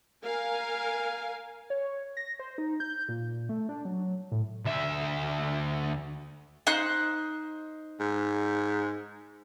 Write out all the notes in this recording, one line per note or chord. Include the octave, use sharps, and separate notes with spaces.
A#4 F5 G#5
C#5
A#6
C5
D#4
G6
A#2
A3
D4
F#3
A2
D2 E5
D#4 C5 F#6
G#2